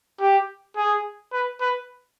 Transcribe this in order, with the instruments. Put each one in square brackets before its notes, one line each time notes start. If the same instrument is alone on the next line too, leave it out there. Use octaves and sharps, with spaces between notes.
[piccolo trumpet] G4
G#4
B4
B4